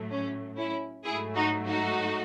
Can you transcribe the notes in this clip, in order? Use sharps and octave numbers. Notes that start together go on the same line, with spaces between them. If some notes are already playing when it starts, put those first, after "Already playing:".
Already playing: A2 F#3 A3
C#4
C#4 E4
G#2 F#3 A3 E4 G#4
D#4 F#4
D#4 F#4